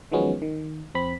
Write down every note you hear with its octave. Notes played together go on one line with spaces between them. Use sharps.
D#3 F3 F#3 G#3 B3 C#4
D#3
F2 C4 B5